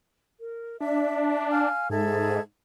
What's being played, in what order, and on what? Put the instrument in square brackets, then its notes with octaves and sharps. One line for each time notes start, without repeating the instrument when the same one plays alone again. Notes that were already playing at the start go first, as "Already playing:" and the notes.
[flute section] A#4
[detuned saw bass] D4 [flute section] E5
[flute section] F5 G#5 F6
[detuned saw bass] G#2 [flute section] G#4 A4 E5